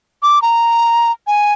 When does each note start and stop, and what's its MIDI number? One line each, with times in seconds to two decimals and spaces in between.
0.23 0.41 86
0.42 1.11 82
1.27 1.53 80